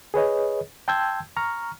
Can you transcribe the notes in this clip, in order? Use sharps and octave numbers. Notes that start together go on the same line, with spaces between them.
G#4 B4 C#5 D#5
G5 A5 C6 E6 G6 G#6
A#5 C#6 F6